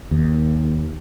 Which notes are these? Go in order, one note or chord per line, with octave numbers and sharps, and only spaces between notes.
D#2